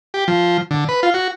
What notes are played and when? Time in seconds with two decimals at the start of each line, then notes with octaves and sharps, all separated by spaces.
0.14 G4
0.28 F3
0.71 D3
0.89 B4
1.03 F4
1.14 F#4